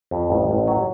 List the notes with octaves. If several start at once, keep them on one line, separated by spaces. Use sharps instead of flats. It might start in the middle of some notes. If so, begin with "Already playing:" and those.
F2
A1
A1
F#3